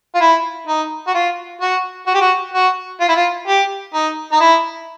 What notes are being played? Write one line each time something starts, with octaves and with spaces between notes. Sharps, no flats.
F4
E4
D#4
F#4
F4
F#4
F#4
G4
F#4
F#4
F4
E4
F4
G4
D#4
D#4
E4